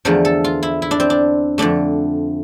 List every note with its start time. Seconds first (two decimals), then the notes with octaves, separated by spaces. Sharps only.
0.05 E2 D3 F3 A3 A#4
0.25 A4
0.44 F4
0.63 E4
0.82 E4
0.91 D4
1.00 C4
1.10 D4
1.58 F2 D3 A3 D4